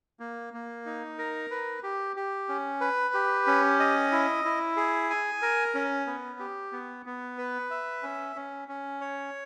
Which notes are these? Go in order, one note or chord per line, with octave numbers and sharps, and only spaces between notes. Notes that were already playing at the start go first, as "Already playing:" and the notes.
A#3
A#3
D#4
A#4
B4
G4
G4
C#4
B4
G4
C#4
D#5
E4
E4
G#4
G#5
A#4
C#4
B3
G4
B3
B3
B4
E5
C#4
C#4
C#4
C#5